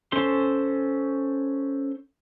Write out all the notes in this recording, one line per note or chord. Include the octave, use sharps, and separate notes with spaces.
C#4 A4 C5 C6